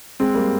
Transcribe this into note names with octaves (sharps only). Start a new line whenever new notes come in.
G#3 C4
G3 A#3